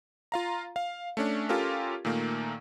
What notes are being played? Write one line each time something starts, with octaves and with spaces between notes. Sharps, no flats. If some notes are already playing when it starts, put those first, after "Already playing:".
F4 F5 A#5
F5
A3 C#4 D4
C#4 F4 G4 A4 A#4
A#2 D#3 A3 A#3